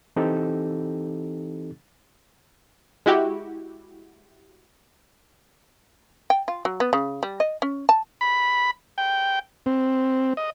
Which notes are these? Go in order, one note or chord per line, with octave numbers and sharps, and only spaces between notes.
E3 C4 D#4 G4 A4
G#3 E4 F#4 G4
G5
F4
F#3
B3
C#3
G3
D#5
C#4
A5
B5
G5
C4
D#5